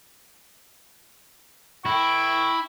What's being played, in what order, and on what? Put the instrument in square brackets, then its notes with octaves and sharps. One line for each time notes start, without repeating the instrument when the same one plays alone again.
[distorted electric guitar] E4 [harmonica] G5 C#6